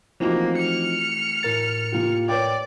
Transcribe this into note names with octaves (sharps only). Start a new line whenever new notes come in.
E3 F3 A3 A#3 C4 D#4 F#4
F6 C#7
A2 A#4 A6
A#3 F4 G4
B4 C#5 D5 G5